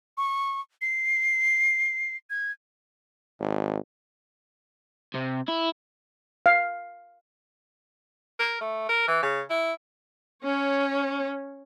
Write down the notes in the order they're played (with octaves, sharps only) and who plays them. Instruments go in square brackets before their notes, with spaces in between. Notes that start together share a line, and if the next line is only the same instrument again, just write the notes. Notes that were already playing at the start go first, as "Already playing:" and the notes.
[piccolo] C#6
C7
G#6
[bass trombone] G#1
[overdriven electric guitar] C3
E4
[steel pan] F5
[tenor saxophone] A#4
A3
A#4
E3
C#3
E4
[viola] C#4 C#5